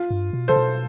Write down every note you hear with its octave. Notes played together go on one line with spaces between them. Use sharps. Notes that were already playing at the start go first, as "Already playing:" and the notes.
Already playing: F4
G2
B2
C3 A4 C5
B2